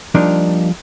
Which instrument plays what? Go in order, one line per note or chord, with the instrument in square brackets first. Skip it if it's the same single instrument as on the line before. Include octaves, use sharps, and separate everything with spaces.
[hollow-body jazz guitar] F3 G3 A#3 D4 D#4